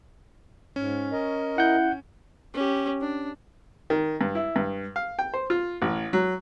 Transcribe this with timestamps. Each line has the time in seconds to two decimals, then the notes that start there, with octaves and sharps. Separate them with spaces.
0.76 G#2 C#4
1.12 A#4 D#5
1.58 E4 F#5 G6
2.54 C#4 G4
3.01 D4
3.90 D#3
4.21 G2
4.35 E4
4.56 G2
4.96 F5
5.19 G5
5.34 C5
5.50 F4
5.82 A1
6.13 F#3